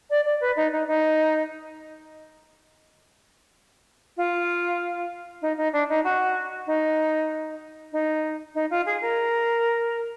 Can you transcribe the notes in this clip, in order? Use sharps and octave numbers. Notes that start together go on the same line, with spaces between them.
D5
D5
B4
D#4
D#4
D#4
F4
D#4
D#4
D4
D#4
F#4
D#4
D#4
D#4
F4
G#4
A#4